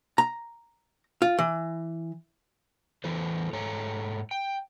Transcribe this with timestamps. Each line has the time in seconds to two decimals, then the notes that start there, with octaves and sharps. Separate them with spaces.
0.18 A#5
1.22 F4
1.39 E3
3.04 E3 E4 A4 C5
3.53 G#2 A4 C#5 A#5
4.31 G5